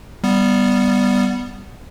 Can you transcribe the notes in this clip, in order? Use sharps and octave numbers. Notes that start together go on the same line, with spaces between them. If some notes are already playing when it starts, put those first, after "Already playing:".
G3 B3